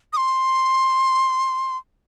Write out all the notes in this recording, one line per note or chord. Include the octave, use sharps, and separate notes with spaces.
D#6
C6